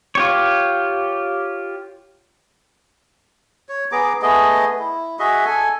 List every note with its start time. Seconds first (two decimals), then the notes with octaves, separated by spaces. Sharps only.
0.15 F4 G4 C#5
3.69 C#5
3.92 B3 G#4 A#5 D6
4.22 A3 B3 G#4 D#5
4.79 E4
5.19 F#4 G#4 D#5 E5
5.46 A4 G#5